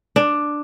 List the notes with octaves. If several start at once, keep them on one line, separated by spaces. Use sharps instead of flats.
D4